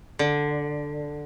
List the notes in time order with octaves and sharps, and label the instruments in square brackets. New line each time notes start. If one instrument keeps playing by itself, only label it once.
[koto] D3